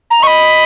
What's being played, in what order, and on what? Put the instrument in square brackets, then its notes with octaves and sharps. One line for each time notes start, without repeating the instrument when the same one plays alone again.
[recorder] A#5
[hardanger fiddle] D#5 [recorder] C#6
[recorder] B5